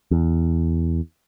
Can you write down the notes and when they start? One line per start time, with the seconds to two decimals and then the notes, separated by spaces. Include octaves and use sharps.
0.11 E2